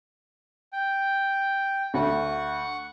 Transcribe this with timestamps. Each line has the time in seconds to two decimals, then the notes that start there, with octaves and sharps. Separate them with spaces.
0.73 G5
1.94 D2 F#5 C#6